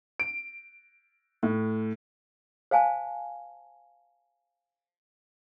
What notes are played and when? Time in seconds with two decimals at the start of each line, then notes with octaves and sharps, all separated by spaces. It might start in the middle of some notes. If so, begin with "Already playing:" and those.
0.20 D7
1.43 A2
2.71 C5 F5 G#5 A5